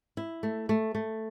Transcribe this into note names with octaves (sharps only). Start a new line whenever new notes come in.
E4
A3
A3
A3